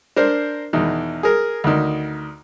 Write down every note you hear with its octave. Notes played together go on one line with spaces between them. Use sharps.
D4 A#4 C5
E2 B2 D#3
G#4 A#4
D2 D#3